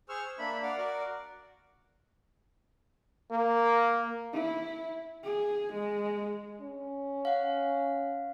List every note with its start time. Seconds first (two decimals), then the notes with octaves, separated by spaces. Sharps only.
0.09 G#4 C5 C#6 E6 F6
0.24 E6
0.39 A#3 D4 E5 B5
0.63 D5 F5 F#5
0.77 F#4 A#4 D5
3.31 A#3
4.33 E4
5.24 G#4
5.73 G#3
6.61 C#4
7.25 F5 F#5